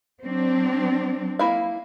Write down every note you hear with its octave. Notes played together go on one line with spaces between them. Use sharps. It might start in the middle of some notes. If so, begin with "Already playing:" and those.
F#3 C4 D4
A#3 E4 F5